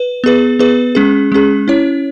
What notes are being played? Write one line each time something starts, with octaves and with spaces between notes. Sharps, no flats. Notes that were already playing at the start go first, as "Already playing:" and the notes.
Already playing: B4
B3 G#4 B4
B3 G#4 B4
G#3 C#4 G#4
G#3 C#4 G#4
C#4 E4 C#5